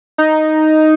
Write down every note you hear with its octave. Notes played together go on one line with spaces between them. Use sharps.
D#4